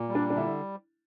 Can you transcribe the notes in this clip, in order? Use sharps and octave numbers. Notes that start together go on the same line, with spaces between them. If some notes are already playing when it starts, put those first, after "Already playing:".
Already playing: A#2
G3
D4
D4
D3 E4